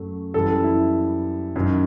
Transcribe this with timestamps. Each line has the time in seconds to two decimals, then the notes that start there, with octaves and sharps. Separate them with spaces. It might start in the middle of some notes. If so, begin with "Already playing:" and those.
Already playing: F#2 F#3 A3
0.34 F#2 E3 G3 A4
0.64 E4
1.56 F#2 D#3 F#3